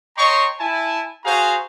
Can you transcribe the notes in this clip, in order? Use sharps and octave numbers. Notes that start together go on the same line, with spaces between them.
C#5 D#5 G5 A#5 C6 C#6
E4 G#5 A5
F#4 G#4 C5 F5 G#5 A#5